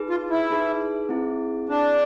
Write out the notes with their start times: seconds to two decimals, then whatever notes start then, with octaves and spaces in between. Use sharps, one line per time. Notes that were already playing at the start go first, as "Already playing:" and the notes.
Already playing: D#4 G#4 B4
0.10 F4
0.30 E4
0.50 D#4 G#4 B4
1.09 C4 E4 G#4
1.69 C4 D4 E4 G#4